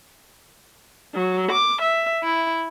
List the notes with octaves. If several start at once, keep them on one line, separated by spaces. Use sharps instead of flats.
F#3
D6
E5
E4